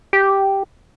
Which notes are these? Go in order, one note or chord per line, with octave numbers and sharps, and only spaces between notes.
G4